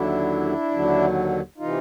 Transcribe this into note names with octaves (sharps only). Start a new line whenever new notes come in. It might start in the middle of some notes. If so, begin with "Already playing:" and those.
Already playing: D#2 D3 F#3 D4 E4
D#2 D3 F#3
C3 E3 D#4 F4